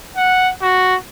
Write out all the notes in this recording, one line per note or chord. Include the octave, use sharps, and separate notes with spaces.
F#5
F#4